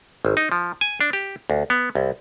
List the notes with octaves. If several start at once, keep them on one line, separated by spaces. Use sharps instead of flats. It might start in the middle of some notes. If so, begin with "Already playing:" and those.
G#1
D#4
F3
G#5
D4
G4
D2
B3
C2